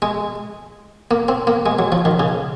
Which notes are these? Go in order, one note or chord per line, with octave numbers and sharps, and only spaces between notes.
G#3
A#3
C4
A#3
G#3
F#3
F3
D#3
C#3